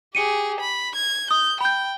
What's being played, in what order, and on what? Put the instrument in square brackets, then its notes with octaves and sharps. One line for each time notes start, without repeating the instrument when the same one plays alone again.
[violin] G4 G#4 [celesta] C#7 D#7
[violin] B5
G#6
[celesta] D#6 [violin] G6
[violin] G5 [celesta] B5 G6